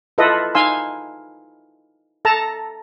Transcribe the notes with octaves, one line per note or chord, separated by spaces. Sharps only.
E4 F4 A4 B4 D#5 E5
D#4 F5 G#5 C6 E6
A4 A5 A#5